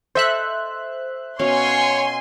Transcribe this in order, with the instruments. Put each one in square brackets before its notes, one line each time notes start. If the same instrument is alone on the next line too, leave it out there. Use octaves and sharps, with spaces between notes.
[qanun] A4 D#5 A5 [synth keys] C5 E5 F#6
[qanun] B2 C#4 F5 [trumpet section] C#5 [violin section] G#5 C6